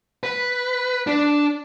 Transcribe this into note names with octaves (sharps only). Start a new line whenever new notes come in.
B4
D4